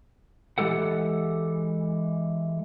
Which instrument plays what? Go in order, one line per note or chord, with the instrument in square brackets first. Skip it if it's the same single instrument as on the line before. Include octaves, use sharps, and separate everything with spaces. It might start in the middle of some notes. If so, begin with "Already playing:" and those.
[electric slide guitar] E3 G#3 G4 A4 F#5